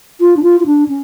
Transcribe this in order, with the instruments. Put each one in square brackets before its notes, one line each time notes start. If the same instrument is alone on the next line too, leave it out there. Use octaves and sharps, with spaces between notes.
[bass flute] F4
D4
F4
F4
D4
C#4